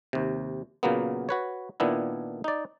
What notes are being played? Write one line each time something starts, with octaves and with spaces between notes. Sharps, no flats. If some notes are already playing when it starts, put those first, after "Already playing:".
D#2 C3
A#2 C#3 F#3 A#3 B3
F#4 B4 C#5
A#2 D#3 B3 D4 E4
D#4 D5